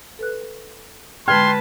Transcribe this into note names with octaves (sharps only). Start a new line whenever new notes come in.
A4 B4 F#6
D3 G#3 B4 G5 A5 C6 F6 G#6